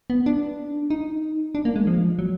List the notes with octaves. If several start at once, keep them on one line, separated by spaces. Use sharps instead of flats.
B3
D4
D#4
D4
A#3
G#3
F3
F#3